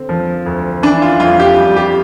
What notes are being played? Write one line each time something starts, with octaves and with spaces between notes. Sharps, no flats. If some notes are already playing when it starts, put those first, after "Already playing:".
Already playing: D3 C4
F3
D2
E3 D4
F4
F2 F4
G4
G3
G4